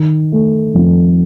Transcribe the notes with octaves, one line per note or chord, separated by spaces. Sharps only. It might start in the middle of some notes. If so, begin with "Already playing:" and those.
Already playing: D#3
A3
F2